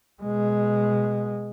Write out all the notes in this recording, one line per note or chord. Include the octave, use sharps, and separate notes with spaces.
B2 G#3